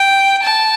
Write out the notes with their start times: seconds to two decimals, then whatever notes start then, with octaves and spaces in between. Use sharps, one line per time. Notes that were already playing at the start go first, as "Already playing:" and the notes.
Already playing: G5
0.43 A5